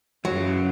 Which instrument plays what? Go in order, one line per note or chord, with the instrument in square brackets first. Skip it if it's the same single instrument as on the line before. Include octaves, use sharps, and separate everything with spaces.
[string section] F#2 C#3 E3 [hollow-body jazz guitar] F#3